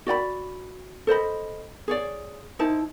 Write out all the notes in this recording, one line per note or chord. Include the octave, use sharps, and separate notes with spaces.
F#4 D5 G5 B5
A4 C5 D#5 B5
G#4 C#5 D5
D#4 E4 C5 A5